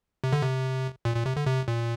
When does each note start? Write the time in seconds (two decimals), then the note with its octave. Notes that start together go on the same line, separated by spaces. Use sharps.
0.24 C3
0.33 D3
0.43 C3
1.05 A#2
1.16 A#2
1.26 C3
1.36 D3
1.47 C3
1.68 A#2